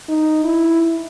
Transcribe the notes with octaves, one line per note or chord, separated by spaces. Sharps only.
D#4
E4